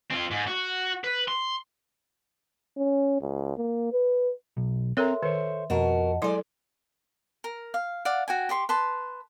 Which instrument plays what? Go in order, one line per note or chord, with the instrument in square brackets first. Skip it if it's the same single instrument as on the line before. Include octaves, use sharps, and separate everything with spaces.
[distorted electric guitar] C4 F4
G#2
F#4
B4
C6
[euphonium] C#4
C#2
A#3
B4
[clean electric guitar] B1
[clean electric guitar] C4 A#5 [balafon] A4 A#4 C#5 [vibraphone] E5 C6
[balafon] D#3 [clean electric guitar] A4 C5 C#5
[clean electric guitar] F2 [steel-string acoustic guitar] B2 F#4 A#4 [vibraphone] D#5 F#5 A5
[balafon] F#3 E4 [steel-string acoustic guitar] G#3 D5 [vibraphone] A4
[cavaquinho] A#4
F5
D5 F5 F#5
F#4 G5 G#5
G4 D5 C6 C#6
B4 A5 C6